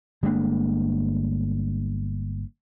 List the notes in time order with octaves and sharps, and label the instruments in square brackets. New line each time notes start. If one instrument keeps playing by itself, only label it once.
[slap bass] G1 G#3 A#3 D4